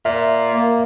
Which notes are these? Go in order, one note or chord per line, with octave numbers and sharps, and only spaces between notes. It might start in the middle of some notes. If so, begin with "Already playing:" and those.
A#2 E5
A#3